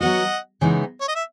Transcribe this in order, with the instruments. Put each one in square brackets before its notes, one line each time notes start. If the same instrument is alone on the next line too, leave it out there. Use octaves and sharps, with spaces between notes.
[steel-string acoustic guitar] F#3 B3 F#4 [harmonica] D#5 F#5
[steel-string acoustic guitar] C#3 E3 G#3 B3 D#4
[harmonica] C#5
D#5
E5